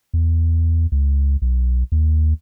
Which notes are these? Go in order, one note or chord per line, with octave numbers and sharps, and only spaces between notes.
E2
C#2
B1
D#2